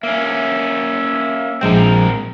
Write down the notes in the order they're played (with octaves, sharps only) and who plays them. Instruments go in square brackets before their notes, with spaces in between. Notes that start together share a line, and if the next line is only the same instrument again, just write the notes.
[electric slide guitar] A#3 C#4 [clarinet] E5
[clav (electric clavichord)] A#1 G#3 G5 [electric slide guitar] C4 A#4